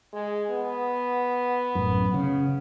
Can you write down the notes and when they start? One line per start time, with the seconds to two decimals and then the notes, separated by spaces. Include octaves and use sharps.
0.13 G#3
0.51 B3
1.75 A1 F#2
2.14 C#3